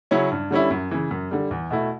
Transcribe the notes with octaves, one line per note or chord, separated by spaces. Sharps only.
C#3 F#3 C#4 E4
G2
D3 G3 C#4 E4
F#2
C#3 E3
F#2
D3 G3
E2
B2 A3 E4